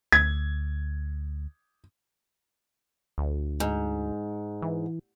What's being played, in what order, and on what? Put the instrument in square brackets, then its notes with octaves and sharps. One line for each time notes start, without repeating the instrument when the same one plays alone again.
[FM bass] D2 [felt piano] G#6
[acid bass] D2
[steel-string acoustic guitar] G#2
[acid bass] E3